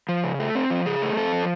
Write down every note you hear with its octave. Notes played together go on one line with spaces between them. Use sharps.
F3
C#3
A3
C4
F3
C#3 G#4
A3
C4 A4
F3